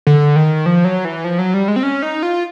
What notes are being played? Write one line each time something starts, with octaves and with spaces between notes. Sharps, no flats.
D3
D#3
F3
F#3
E3
F3
F#3
G3
G#3
C4
C#4
D#4
F4